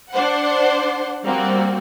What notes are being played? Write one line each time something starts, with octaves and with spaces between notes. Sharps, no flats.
D4 C5 F#5
G3 A#3 C4 F#4